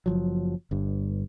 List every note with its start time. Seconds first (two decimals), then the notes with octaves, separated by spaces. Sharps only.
0.06 F#1 F3 F#3
0.71 G1 G2